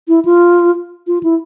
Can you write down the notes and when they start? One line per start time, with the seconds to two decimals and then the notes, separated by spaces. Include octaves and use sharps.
0.08 E4
0.25 F4
1.07 F4
1.23 E4